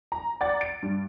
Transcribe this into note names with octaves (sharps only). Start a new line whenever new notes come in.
A#5
D5 F#5 A#5 A6
D7
G2